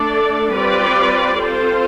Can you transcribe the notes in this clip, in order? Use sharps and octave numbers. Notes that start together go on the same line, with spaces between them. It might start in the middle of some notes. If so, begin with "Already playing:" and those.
Already playing: A3 D4 A4 D5
G3 C4 F4 B4 D5
C4 F4 A4 C5